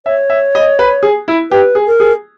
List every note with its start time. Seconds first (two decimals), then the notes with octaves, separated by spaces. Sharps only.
0.06 C#5 E5
0.30 E5
0.55 D#5
0.79 B4
1.03 G#4
1.28 E4
1.51 G4 B4
1.75 G#4
1.87 A#4
2.00 G#4